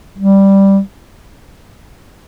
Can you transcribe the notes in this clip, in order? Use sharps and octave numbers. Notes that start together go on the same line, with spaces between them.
G3